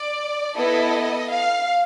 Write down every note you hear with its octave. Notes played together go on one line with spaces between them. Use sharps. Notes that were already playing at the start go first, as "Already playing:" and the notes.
Already playing: D5
B3 E4 A4 D#5
F5